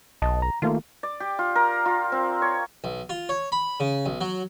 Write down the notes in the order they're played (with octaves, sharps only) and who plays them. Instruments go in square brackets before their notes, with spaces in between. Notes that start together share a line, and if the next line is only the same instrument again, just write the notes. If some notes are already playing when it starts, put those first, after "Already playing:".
[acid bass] B1 [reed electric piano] D#5 A5
[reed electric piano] A#5
[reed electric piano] D#3 A3 A#3 [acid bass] F4
[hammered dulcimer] D5
G4
F4
A#4
F4
C4
C#5
[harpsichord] B1
F4
C#5
B5
C#3
B1
F#3